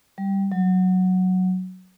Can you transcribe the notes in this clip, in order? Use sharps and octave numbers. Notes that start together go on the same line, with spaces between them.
G3
F#3